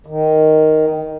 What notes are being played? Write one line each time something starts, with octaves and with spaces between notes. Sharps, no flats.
D#3